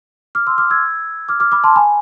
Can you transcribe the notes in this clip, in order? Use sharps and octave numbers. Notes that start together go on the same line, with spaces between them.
D6 F6
C6 E6
D6 F6
E6 G#6
D6 F6
D6 F6
B5 D6
A5 C6
G#5 B5